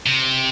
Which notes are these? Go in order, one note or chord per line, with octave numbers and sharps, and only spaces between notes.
C3